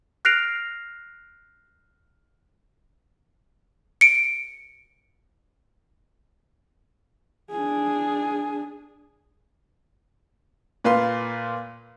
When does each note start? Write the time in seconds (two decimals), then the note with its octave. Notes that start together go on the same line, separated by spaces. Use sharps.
0.25 F6 F#6 A#6 C7 D7 F7
4.01 C#7 D7
7.52 D4 G#4
10.84 A#2 B4 F5 C6